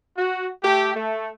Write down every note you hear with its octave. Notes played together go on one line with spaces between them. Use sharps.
F#4
A3 G4
A3